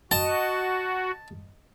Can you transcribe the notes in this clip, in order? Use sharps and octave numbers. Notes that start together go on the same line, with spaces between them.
F#4 D#5 A5